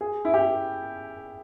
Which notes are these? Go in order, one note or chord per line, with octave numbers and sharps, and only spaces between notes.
G#4
E4
G4